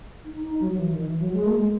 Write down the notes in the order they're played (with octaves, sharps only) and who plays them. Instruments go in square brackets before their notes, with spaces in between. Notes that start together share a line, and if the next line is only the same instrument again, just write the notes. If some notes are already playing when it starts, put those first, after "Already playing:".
[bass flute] D#4
D#4
F#3
F#3
E3
D#3
E3
F#3
G#3
A#3
G#3